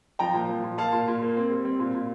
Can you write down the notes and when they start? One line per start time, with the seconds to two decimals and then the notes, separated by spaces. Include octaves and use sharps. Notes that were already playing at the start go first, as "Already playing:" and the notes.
0.19 F3 G5 A#5
0.34 A#2
0.49 F3
0.64 A#2
0.77 A#3 F5 A5
0.93 A#2
1.08 A#2
1.22 A#3
1.37 C4
1.50 G3
1.65 C4
1.80 A#2
1.95 A#2